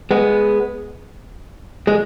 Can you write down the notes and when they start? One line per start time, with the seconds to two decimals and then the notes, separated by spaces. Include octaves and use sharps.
0.11 G#3 B3
1.87 G#3